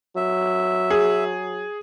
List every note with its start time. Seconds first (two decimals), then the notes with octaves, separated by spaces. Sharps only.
0.16 F#3 E5
0.90 G#4